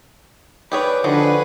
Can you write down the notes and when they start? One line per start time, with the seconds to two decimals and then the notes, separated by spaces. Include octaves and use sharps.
0.72 G4 G#4 B4 C#5 D5
1.04 D3 F3 D#4 F#4 G#4 B4